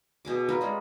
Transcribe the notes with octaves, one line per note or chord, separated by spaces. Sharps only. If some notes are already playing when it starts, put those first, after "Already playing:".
B2 G#4 D6
F4 A#4 B4
G3 G#3 C#4